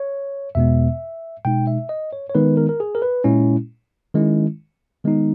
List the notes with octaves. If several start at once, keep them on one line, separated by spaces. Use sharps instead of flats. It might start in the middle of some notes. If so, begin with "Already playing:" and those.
Already playing: C#5
E2 B2 G#3 B3 E5
B2 G#3 D#4 G5
E5
D#5
C#5
C#5
D#3 G#3 B3 D#4 B4
A#4
A#4
G#4
A#4
B4
A#2 G#3 C#4 E4
D#3 G#3 C#4 E4
D#3 G#3 B3 D#4